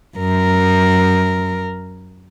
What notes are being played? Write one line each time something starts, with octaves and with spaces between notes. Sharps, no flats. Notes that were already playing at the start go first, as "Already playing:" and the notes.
F#2 A#4